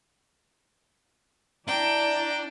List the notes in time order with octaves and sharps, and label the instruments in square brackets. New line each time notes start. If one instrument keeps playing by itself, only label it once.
[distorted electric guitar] D4 [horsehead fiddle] E4 D5 [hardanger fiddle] G5 [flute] A#5